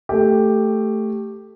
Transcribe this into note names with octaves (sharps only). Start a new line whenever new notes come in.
A3 G4